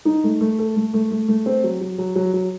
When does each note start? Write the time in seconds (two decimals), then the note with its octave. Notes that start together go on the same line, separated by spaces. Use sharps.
0.05 D#4
0.24 A3
0.41 A3
0.59 A4
0.76 A3
0.94 A3
1.11 A3
1.28 A3
1.46 C4
1.64 F#3
1.81 F#3
1.98 F#3
2.16 F#3
2.33 F#3